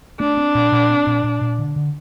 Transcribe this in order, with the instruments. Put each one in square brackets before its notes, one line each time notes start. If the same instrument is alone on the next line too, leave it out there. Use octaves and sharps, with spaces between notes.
[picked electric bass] A3 [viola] D4
[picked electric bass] C4
A#2
A#2
C4
A#2
A#2
A#2
D3
D3